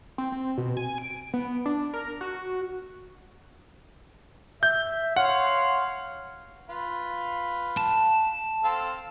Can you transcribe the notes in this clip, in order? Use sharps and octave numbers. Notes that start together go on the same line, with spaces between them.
C4
C4
B2
G#5
D7
B3
D4
A#4
F#4
E5 G6
C#5 F5 F#5 C6
F4 B4 F5
A5
C4 A4 F5